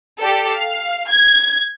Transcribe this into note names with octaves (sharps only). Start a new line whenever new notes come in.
G4 A4 D5
F5
G#6